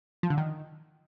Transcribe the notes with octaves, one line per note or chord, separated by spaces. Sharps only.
F3
D3
D#3